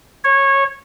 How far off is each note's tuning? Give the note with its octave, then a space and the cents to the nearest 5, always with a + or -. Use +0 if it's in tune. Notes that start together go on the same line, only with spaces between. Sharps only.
C#5 -15